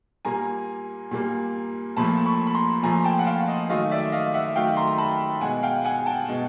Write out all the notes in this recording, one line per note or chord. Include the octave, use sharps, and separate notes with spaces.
A#2 G3 A#3 G#5 A#5
A#2 G3 A#3
A#2 F3 A3 A5 B5
B5 C#6
B5
A#5 C6
A#2 F3 A3 G#5 A#5
G5 A5
F#5
F5 G5
D#5
D#3 F#3 A3 D#5 F5
D5 E5
D#5 F5
E5 F#5
D#3 F#3 A3 F5 G5
A#5 C6
A#5
A5 B5
B2 G#3 F#5 G#5
F5 G5
F#5 G#5
G5 A5
B2 G#3